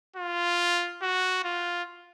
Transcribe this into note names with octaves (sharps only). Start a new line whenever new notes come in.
F4
F#4
F4